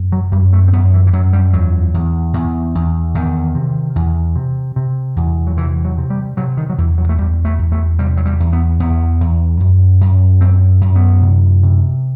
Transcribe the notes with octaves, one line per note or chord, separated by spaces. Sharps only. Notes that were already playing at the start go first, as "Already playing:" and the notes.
Already playing: F#2
F#3
F#2 G3
A3
C4
F#2 B3
E3
E3
F#2 F#3
G3
E2 F#3
E2
E2
E2
E2 D#3
C3
E2
C3
C3
E2
F#3
C3 E3
F#3
C3
G3
C3 F#3
D#3
F#3
E2 E3
F#3
A3
E2 G3
A3
E2
A3
C3 G3
F#3
G3
E2
B3
E2 B3
E2
F#2
F#2
F#2 C4
F#2
B3
C3
C3